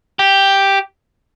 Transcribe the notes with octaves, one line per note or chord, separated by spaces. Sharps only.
G4